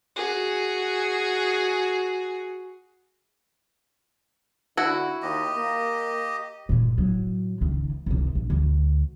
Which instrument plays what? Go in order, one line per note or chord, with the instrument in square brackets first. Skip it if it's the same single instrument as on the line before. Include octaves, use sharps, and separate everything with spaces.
[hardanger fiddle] F#4 G#4
[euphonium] D3 [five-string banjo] E4 F#4
[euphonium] D#2 [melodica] G4 D#5
[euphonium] A#3
[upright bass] A#2 G#3
A2 F#3
C#2 D#3
C2 C3
A#1
D2